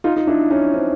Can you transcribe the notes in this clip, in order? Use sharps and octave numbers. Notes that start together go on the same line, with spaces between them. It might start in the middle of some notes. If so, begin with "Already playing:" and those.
D#4 F4
D#4
D4 E4
C#4 D#4
C4 D4